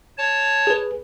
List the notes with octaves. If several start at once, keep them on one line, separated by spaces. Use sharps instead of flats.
C#5 A5
G#4 B4